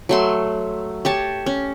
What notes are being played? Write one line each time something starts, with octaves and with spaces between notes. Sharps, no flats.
F#3 A3 C6
G4 C#5 A5
C#4